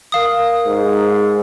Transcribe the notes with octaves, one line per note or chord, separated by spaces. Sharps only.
A#4 F5 D#6
G#2